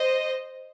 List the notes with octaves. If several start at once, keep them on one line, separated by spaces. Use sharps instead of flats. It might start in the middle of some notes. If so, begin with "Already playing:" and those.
Already playing: C5 D#5